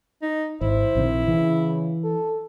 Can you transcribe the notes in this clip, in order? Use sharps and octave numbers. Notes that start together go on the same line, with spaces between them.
D#4
G#1 E4 C5
A#1 C3 D#3
C#3 E3
A4